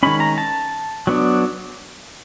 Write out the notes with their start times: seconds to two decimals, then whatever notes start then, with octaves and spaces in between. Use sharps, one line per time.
0.03 D#3 G#3 C#4 B5
0.20 A#5
0.38 A5
1.07 F#3 B3 D4